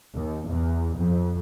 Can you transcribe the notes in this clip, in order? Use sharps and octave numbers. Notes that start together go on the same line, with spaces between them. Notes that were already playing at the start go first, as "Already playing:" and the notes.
D#2
E2
F2